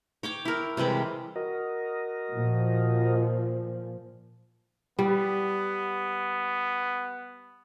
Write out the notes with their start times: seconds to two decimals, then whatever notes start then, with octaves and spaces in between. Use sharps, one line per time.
0.23 C#5 G5 D6
0.45 E4 A#4
0.77 C3 E3 G3 G#3
1.36 F#4 A#4 D#5
2.33 A#2 F3
4.99 G3 B3